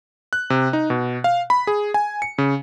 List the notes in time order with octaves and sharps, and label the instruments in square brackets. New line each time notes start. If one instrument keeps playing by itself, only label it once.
[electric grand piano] F#6
C3
D#4
B2
F5
B5
G#4
G#5
C#7
C#3